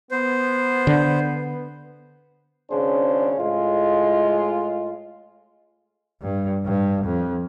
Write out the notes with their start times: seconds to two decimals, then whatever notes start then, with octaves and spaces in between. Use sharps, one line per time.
0.11 B3 C5
0.87 D3
2.70 G#1 C#3 C#4 D4 G#4 C5
3.38 A2 G#3 F4
6.22 G2
6.65 G2
7.04 F2